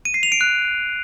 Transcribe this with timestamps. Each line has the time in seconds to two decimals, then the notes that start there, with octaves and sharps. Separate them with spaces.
0.05 D#7
0.14 C7
0.23 F7
0.32 D7
0.41 F#6